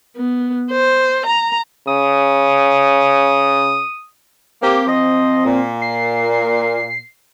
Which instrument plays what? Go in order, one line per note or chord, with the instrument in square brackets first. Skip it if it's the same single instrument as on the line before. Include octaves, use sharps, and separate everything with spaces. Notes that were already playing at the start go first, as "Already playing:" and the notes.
[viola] B3
C5
A#5
[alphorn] C#3 [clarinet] D#6
[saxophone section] A#3 G4 [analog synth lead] C4
[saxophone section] F3 C5 D#5
A#2
[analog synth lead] C7